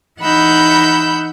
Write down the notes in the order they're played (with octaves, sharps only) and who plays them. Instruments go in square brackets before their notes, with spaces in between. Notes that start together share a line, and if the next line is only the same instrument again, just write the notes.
[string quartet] E3 D#4 F#5 B5 E6 G6